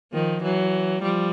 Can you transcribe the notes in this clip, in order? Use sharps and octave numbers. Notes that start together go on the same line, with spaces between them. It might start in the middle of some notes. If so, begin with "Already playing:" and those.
D#3 F3
E3 F#3
F3 G3